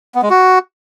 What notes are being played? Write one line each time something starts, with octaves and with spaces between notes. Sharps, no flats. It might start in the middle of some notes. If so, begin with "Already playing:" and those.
B3
G#3
F#4